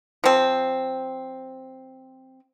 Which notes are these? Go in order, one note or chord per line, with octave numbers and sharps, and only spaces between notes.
F3 C4